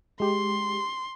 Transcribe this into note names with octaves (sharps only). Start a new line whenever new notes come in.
G#3 G4 C6